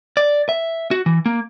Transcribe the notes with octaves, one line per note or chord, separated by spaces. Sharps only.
D5
E5
F#4
E3
A#3